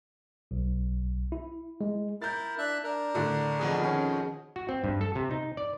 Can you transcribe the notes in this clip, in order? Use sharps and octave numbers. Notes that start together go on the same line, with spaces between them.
B1
E4
G#3
E4 A#4 G6 A6
D4 E5 F#6
D4 A#4
A2 D3
F2 B2 G#4
D#3 C#4
F#4
C4
G2
A4
C3
D#4
D5